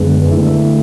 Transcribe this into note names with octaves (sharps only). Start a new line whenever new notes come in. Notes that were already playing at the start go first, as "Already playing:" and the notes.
Already playing: F#2 D3 G#3 B3
D3 A3 E4